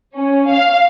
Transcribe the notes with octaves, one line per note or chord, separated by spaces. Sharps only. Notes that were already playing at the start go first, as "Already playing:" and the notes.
C#4
F5